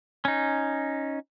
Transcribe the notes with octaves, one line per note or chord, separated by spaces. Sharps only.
C#4 D#4